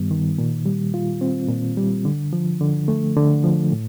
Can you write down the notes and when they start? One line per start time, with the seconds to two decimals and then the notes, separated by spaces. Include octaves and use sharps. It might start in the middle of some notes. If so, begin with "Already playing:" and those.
Already playing: G2 D#3 G3 B3
0.11 D#3
0.38 A#2
0.66 G3
0.94 F4
1.21 C4
1.49 A#2
1.77 G3
2.05 D3
2.33 F3
2.61 D3
2.88 A3
3.17 D3
3.44 F3
3.72 A2